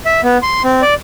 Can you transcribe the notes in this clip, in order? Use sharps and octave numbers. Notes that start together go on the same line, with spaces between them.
E5
B3
C6
C4
D5